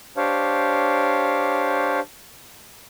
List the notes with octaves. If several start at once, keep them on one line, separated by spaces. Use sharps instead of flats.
D4 G4 C5 C#5 F5